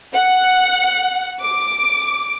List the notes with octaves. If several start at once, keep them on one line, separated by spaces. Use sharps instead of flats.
F#5
D6